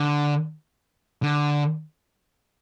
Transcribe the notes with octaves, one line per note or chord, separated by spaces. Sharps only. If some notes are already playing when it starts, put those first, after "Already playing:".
Already playing: D3
D3